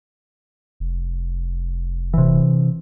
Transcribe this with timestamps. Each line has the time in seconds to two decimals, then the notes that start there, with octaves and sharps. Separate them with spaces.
0.80 F1
2.14 C3 E3